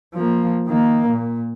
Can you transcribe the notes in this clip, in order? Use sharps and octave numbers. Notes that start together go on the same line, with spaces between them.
F3 A#3
D#3 A#3
A#2